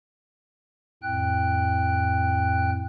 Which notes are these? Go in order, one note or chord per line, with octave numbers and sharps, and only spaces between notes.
F2 A2 G5 F#6